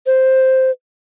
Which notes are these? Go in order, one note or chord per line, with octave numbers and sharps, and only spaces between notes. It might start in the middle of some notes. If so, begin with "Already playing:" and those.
C5